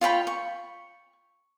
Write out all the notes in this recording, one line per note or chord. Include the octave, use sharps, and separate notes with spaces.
F4 C#5 G5 B5
C#6